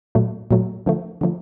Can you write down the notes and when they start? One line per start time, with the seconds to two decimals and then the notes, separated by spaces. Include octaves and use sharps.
0.15 A#2 F#3 A3
0.51 A#2 F#3 A3
0.86 D3 F3 A3
1.21 D3 F3 A3